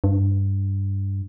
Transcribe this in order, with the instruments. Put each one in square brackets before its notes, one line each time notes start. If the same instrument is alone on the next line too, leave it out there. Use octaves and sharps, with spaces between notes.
[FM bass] G2